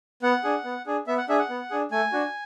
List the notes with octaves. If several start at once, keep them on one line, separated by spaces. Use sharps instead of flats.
B3 F#5
D4 G#4
B3
D4 G#4
B3 E5
F#5
D4 G#4 E5
F#5
B3
D4 G#4
A3 G#5
D4 F#4